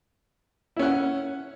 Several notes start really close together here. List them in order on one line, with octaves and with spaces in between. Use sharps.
E4 C#4 F#5